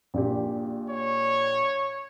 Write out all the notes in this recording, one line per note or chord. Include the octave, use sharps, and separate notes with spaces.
A#1 A#2 G4
C#5